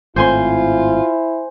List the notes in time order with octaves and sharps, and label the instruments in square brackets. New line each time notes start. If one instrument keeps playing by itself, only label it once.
[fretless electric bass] G#1 A2 C4 [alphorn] E4 [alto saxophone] F4 [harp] C5 G#5 C6